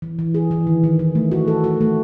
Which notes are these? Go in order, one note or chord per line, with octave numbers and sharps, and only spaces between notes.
E3
E3
G#4
E3
D#3
D#3
D#3
A3
F#4
A4
F#4
A3